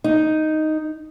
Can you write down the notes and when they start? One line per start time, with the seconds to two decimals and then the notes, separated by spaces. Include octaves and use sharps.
0.04 D#4